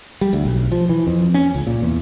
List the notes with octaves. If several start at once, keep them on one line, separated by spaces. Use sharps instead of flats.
G3
D2
B1
F3
E3
F2
C#4
C#2
A#2
E2